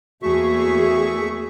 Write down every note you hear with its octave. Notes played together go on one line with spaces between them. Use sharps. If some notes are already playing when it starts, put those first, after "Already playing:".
E2 A3 A#3 F#4 G#4 E5 C#6